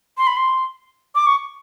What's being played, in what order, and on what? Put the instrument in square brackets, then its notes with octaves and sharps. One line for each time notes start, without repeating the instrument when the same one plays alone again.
[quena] C6
B5
C6
D6
C#6